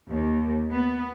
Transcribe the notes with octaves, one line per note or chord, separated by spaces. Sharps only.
D#2
B3